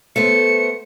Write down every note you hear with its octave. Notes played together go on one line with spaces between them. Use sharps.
A3 B3 C5 C#7